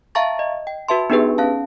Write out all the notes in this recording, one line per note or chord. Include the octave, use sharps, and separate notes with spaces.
E5 F5 A5 A#5 C#6 A6
D#5
G5
F#4 B4 E5 A5 C6
B3 D4 D#4 G4 G#4 B4
C#4 F5 A5